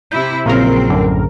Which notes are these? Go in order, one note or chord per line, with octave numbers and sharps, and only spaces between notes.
C3 E4 G6
A#1 A#2 C#3 F#3 C4 A#4
F#2 A2 D3